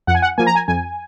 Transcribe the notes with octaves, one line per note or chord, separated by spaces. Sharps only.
F2 F#5
G#5
F#5
F3 A#3 G#5
A#5
G#5
F2 G#5